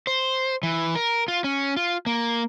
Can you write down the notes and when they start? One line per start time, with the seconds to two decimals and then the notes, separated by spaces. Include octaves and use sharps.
0.07 C5
0.63 E3
0.95 A#4
1.28 F4
1.44 C#4
1.76 F4
2.06 A#3